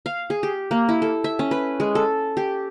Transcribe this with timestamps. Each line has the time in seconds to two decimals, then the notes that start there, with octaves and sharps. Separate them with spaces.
0.06 F5
0.30 G#4
0.43 G4
0.71 A#3
0.89 E4
1.02 A4
1.24 E5
1.39 C#4
1.51 B4
1.80 G#3
1.95 A4
2.37 G4